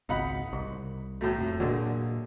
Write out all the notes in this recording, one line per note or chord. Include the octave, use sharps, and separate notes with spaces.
G#1 C#2 D#4 F#5 B5
C2
A2 F#3 A3
F1
A#2 D3 F#3 G#3